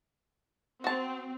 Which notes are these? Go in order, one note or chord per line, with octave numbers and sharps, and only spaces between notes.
C4 F#4 A5